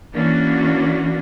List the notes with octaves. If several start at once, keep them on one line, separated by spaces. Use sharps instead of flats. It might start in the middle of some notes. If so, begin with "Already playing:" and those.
E3 A#3 C#4 D4 F#4